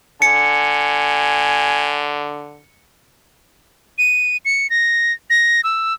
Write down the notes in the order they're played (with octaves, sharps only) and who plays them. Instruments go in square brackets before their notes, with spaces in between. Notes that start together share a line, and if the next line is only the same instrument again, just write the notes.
[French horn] D3 [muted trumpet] G#5 [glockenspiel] C#7
[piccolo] D#7
C#7
A#6
A#6
E6